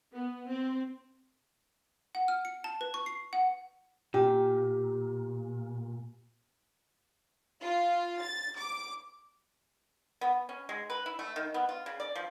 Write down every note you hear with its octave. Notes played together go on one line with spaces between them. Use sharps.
B3
C4
F#5
F6
C#7
A5
B4
C#6
C7
F#5
A#2 G4
F4
A6
D6
B3
C#4
G#3
B4
E4
A3
D#3
B3
F4
C#3
D5
F3